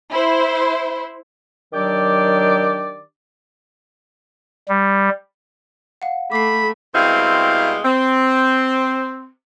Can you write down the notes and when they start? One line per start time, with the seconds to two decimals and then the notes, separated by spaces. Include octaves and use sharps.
0.10 E4 C5
1.73 D#3 F#3 D4 G4 D5
4.69 G3
6.02 F5 F#5
6.32 A3 B5 D6 C7
6.95 B2 G3 G#3 C4 E4 F5
7.85 C4